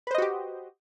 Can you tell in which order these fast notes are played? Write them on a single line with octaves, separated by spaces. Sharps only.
B4 C5 D#5 F#4 G4